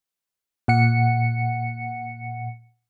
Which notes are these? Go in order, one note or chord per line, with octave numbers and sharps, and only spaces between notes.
A#2 F#5 C#7